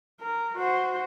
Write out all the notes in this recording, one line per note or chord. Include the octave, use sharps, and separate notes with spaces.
A#4
F#4 C5